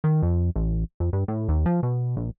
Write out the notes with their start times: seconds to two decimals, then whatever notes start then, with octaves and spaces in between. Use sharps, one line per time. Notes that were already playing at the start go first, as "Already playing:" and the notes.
0.04 D#3
0.23 F2
0.56 A1
1.00 F2
1.13 G2
1.28 A2
1.49 D#2
1.66 F3
1.83 B2
2.17 A#1